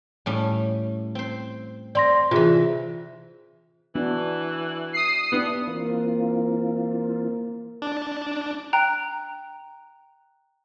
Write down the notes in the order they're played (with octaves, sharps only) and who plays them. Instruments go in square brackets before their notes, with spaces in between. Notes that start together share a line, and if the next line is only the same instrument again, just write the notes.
[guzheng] A2 G3 C#4
C4 C5
[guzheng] C4 [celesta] D5 C6 A#6
[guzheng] C3 E3 [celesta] F4 G#4
[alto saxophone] E3 [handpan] B3 D4 F#4
[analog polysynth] D#6 C7
[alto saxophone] B3 [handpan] D4 E4 G4
[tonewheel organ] E3 C4 F4 [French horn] A#3
[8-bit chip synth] D4
[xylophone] G5 A#5 F#6